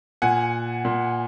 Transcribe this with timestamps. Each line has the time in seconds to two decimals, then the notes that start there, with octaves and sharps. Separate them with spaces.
0.22 A#2 F#5 G#5
0.85 A#2